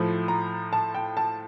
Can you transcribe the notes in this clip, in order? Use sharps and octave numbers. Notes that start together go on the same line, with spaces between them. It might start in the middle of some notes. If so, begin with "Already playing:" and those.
Already playing: A2 F3 A3
A#5
A5
G5
A5